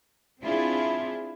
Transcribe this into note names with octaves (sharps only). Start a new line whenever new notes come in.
C4 D4 E4 F4 G#4